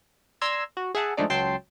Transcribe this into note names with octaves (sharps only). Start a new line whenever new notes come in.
D5 A#5 C6 E6 G#6
F#4
G#4 E5 F#5 A5
F3 G#3 A3 D4 D#4 D5
C#2 F#3 G5 A5 C6 C7